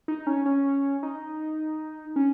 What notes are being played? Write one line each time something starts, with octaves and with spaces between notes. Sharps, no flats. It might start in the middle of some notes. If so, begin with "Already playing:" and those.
D#4
C#4
C#4
D#4
C#4